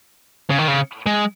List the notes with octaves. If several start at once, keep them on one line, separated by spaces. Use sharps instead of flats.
C#3
D#3
C#3
G#3